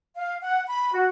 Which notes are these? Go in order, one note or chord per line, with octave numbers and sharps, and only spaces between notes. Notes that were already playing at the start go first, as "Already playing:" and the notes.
F5
F#5
B5
F#4